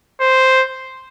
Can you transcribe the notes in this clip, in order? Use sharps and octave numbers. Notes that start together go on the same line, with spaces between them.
C5